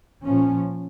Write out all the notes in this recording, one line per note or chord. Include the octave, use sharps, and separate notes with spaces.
A#2 F3 C#4